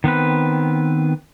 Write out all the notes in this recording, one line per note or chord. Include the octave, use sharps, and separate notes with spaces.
D#3 B3 C4 B4